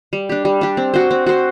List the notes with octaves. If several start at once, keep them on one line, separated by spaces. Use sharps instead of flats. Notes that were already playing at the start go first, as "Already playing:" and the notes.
G3
D4 G4
G3
D4 G4
C4
F#4 C5
C4
F#4 C5